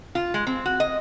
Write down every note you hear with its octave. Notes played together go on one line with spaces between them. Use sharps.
F4
G#3
C4
F#4
D#5